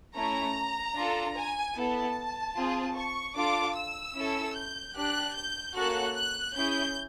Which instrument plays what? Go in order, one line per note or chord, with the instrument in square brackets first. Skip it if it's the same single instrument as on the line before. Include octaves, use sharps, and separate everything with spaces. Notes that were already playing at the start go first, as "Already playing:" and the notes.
[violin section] A3 C#4 E4 A#5
D4 F4 A4
G#5
B3 E4 A4 A5
C4 F4 G#4
C#6
D4 F4 A4 D6
E6
C#4 E4 A4
G6
D4 G4 F#6
G6
A#3 C#4 F#4 A4 F#6
F#6
C#4 E4 G#4 G6